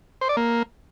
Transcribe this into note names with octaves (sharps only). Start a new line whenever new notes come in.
C5
D5
A#3